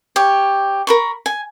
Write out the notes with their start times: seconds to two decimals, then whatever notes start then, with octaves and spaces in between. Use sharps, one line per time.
0.16 G4 C#5
0.87 A#4 B5 C#6
1.26 G#5